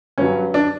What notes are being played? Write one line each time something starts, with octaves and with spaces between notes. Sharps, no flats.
G2 F#3 C#4
D4